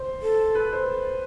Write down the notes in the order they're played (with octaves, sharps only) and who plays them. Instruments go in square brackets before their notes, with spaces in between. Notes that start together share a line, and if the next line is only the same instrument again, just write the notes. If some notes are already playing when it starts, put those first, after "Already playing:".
Already playing: [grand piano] C5
[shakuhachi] A4
[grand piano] B4
C5